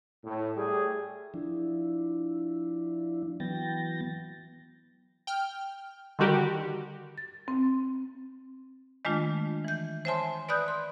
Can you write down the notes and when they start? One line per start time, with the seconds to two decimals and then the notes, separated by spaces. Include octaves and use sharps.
0.23 A2
0.55 G3 A3 G4 G#4
1.34 F3 D4 E4
3.40 E3 F#3 B3 G5 A6 A#6
5.27 G5 F6
6.19 D3 D#3 G3 F#4 G4 A#4
7.18 A6
7.48 C4
9.05 D#3 G#3 A3 D4 F4
9.64 E3 G6
10.05 C5 C#5 E5 G#5 A5 C6
10.48 B4 D5 B5 D#6 F#6 G6
10.68 C6